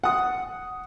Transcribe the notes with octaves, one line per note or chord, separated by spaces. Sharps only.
F#5 D#6